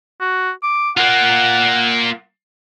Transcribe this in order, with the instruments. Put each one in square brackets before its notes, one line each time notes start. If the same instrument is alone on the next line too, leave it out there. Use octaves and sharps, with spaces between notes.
[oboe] F#4
D6
[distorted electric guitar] A#3 F4 [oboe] F#5